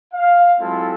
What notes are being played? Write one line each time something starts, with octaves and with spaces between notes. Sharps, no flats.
F5
F#3 G#3 C4 E4 F4 A4